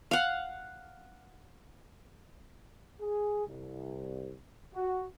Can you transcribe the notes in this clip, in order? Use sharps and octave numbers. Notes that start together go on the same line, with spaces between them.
F5 F#5
G#4
C2
F#4